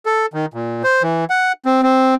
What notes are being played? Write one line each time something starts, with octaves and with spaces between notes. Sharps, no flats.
A4
D#3
A#2
C5
E3
F#5
C4
C4